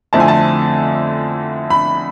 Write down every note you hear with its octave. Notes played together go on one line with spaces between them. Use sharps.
F2 D3 A3 C4 E4 A5
G#5
A5
B5